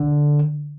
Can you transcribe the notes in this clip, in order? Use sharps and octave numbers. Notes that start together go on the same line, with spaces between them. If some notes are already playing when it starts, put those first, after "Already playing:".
Already playing: D3